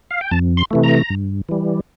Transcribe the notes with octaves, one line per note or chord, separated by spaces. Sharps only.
F5
G5
F2 A5
C6
C3 E3 A3
A#5
G2
E3 G3